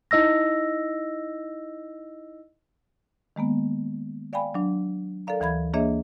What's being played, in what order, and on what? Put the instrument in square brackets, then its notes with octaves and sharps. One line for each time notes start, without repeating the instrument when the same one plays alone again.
[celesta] D#4 E4 D#5 E6 A#6
[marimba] D#3 G#3 A#3 B3
D5 F5 G5 G#5 B5
F#3 D4
A4 A#4 D5 F5 A#5
D2 E3 F5 B5 G#6
A#3 D4 G#4 C#5 D#5 E5